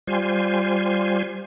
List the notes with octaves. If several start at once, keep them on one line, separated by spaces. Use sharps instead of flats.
G3 F4 C5 G#5